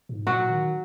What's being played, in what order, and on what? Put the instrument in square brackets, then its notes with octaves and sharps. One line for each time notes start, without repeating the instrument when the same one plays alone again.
[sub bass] G#2
[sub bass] A#2 [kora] F#3 F#4
[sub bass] D#3